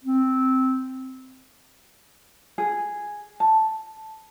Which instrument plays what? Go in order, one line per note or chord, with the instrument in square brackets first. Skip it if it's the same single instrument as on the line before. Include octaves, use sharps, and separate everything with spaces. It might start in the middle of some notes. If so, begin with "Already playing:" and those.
[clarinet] C4
[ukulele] G#4
A5